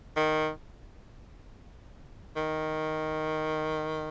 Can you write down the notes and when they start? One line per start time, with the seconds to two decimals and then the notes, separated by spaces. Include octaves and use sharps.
0.16 D#3
2.36 D#3